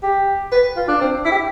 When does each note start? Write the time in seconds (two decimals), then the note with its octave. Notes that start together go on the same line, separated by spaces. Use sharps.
0.03 G4
0.52 B4
0.76 F4
0.88 D4
1.01 C4
1.25 E4
1.31 G4